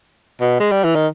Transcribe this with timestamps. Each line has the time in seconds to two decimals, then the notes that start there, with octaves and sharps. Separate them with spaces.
0.41 B2
0.60 G#3
0.72 G3
0.84 E3
0.95 D#3